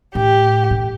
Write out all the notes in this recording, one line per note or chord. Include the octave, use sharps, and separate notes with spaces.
A2 G4
A2